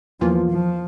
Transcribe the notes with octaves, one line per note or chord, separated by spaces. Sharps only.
E2 E3 F3 A#3 F4
F3